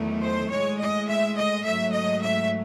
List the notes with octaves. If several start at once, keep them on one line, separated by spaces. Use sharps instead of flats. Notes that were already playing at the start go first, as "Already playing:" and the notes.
Already playing: E2 D#3 F#3 A3
C5
A2 G#3 C#5
D#5
E5
D#5
G#2 F#3 A3 E5
D#5
E5